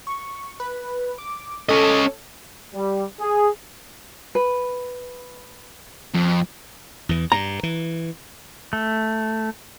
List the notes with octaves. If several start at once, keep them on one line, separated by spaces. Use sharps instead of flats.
C#6
B4
D6
C#4 A4 D#5
G3
G#4
B4
F2
E2 E3
G2 A#5
E3
A3